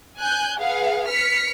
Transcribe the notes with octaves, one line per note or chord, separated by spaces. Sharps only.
G#5 F#6 G6
G#4 B4 F5 F#5
B4 F6 B6 C#7